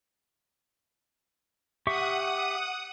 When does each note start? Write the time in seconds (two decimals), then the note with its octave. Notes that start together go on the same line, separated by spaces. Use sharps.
1.87 G4 E5 F#5 C#6 D#6